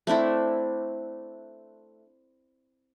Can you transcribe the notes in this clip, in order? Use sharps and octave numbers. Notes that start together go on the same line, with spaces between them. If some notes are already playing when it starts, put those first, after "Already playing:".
A3 C4 D4 E4